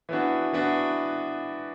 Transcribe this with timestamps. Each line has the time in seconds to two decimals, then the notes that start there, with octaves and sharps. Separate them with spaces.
0.09 E3 B3 D4 F#4
0.53 E3 B3 D4 F#4